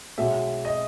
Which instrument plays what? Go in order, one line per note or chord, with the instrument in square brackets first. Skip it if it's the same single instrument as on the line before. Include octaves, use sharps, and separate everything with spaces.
[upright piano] B1 B2 G#3 E5
D#5